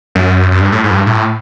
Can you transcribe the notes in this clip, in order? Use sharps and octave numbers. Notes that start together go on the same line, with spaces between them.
F#2
F#2
G2
A2
G#2
F#2
G2
A2